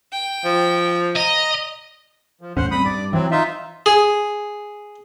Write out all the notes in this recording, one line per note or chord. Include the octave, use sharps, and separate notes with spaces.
G5
F3
D#5 A#5
F3
E2 A2 C#4 C5 F#5
G3 G#3 C4 B5 D#6
G2 D5
E3 F#3 C4
D#4 F4 E5
G#4